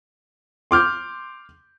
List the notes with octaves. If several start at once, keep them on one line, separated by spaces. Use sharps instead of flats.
C6 D6 F6 G6